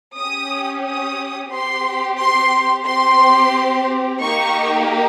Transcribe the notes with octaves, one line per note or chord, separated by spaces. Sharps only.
C#4 G4 D#6
D#6
C4 G4 C6
C6
C4 G4 C6
A#3 D#4 G4 C#6